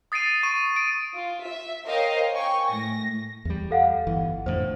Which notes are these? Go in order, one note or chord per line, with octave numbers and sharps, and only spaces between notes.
D#6 A6 C7 D7 D#7
C#6 D#7
D7
F4
E5
A#4 C5 C#5 D#5 F5 G5
G5 G#5 C#6
A2 A#6
E2 G3
A4 F5 F#5
G1 E3
F2 A2 D3 C5